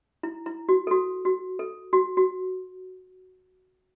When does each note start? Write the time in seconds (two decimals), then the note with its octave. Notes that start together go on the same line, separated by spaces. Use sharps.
0.23 E4
0.46 E4
0.69 F#4
0.87 A4
0.91 F#4
1.25 F#4
1.59 A4
1.93 F#4
2.17 F#4